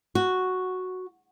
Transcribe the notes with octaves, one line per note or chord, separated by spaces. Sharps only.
F#4